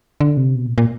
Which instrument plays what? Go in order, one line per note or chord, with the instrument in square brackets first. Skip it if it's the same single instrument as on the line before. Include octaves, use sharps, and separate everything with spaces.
[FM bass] D3
C3
B2
A#2
A#2